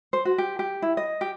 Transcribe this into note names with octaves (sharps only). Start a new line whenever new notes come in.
C5
F#4
G4
G4
E4
D#5
G4